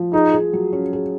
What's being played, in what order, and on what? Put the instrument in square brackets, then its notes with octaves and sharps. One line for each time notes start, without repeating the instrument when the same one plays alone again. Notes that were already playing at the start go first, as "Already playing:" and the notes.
Already playing: [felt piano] F3
[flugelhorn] D#4 [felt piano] G#4
[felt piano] G#4
F#3
C#4
G#4